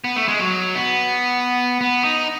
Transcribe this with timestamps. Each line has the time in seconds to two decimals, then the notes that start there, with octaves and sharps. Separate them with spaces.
0.04 B3
0.16 A3
0.28 G#3
0.39 F#3
0.75 B3
1.81 B3
2.04 D#4